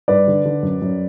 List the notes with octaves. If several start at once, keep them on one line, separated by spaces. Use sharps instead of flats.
G2 B4 D5
D3
D3
F#2
F#2